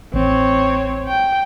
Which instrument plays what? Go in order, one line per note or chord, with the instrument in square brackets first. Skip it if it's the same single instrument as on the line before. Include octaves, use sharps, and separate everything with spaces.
[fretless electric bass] A1 [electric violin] C4 C#5
[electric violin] G5